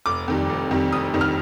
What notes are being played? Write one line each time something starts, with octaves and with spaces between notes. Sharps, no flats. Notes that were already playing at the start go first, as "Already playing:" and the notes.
F1 D6
F2 D#3 G3
F1
F2 D#3 G3
F1 D#6
F2 D#3 G3
F6